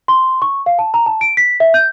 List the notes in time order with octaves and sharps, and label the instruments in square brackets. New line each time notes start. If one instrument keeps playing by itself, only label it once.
[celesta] C6
C#6
F5
A5
A#5
A5
D7
B6
E5
G6